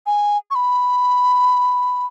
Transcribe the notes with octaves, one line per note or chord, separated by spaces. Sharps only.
G#5
C#6
B5